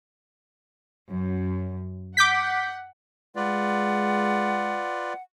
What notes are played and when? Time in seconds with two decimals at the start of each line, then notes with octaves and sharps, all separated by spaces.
1.10 F#2
2.17 F#5 D6 G6 B6
3.36 G#3 F4 B4 D5 F#5